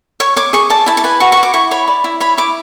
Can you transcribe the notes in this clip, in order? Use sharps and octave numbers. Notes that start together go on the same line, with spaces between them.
C#5 C#6
C#5 D6
G#4 C#6
D5 A5
E4 A5
A5
B4 G#5
F#4 C#6
C#6
F#4
D6
E4 C#6
C#5 B5
D5
E4
C#5 B5
E4 D6